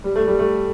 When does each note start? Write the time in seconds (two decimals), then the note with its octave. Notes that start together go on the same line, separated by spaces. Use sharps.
0.04 G3
0.16 A3
0.28 G3
0.39 A3